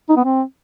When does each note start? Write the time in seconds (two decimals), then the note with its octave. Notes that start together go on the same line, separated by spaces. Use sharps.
0.09 D#4
0.17 B3
0.24 C4